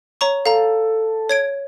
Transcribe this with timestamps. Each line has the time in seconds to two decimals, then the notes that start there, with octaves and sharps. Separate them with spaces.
0.21 C#5 A#5 C#6
0.46 A4 F5 A#5
1.29 C#5 G#6 D7